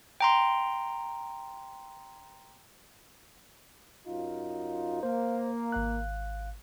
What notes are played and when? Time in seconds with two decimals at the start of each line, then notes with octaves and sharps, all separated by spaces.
0.20 G5 A#5 C6
4.06 F#2 D#4 F4
5.03 A#3 C5
5.72 G#1 F5 F#6